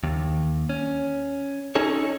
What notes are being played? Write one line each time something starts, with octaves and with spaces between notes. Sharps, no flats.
D#2
C#4
C#4 D#4 G#4 A4 C#5